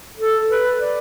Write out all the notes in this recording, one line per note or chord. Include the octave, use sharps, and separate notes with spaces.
A4
B4
D5